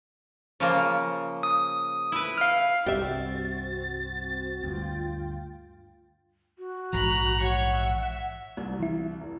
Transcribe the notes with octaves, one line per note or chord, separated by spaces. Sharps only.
C#3 F3 A#3
D#6
E4 B4
F5 F6
C2 G2 C4 F#4 G4 E5 A6
D2 G2 F4 G5
F#4
A#1 G#2 E3 A#5 B5
C#5 F#5 C#6
E5
C2
E3 E4
F1